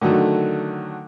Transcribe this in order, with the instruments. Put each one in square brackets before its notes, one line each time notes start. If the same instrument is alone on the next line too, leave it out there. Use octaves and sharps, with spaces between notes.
[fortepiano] D3 D#3 F#3 A3